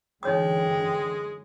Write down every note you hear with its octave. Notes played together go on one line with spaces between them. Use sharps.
F#2 D3 E3 G#3 D#4 C#5 G5 D#6